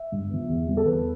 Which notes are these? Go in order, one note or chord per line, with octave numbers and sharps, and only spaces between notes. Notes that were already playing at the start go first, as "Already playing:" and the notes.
Already playing: E5
G2
F3 B3
E2
C3 G3 B3
A4
E2 B4